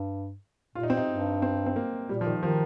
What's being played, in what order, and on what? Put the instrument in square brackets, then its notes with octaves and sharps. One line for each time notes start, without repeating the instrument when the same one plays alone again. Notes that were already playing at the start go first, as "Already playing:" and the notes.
Already playing: [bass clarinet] G2
[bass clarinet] A#2 [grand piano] F4
[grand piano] D#4
C4
D#4
[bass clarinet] G2
[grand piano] C4
C4
A#3
[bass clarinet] A#2 [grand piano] G3
[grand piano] F3
D#3
[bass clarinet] D#3 [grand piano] F3